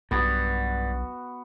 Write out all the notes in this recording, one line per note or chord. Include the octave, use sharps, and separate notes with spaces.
B1 G2 B3 F#4